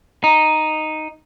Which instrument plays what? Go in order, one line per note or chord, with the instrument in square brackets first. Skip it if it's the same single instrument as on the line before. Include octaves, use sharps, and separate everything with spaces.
[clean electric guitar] D#4